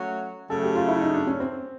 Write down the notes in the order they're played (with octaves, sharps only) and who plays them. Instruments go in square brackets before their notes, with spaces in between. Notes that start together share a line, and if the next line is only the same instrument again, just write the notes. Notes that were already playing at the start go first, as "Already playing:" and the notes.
Already playing: [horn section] F#3 A3 C#4 F#4
[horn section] C#3 F#3 A3 [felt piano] A4
[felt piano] G4
F4
E4
D#4
D4
C#4
C4